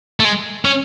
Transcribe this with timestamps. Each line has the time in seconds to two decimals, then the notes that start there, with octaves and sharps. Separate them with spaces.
0.20 A3
0.25 G#3
0.65 C#4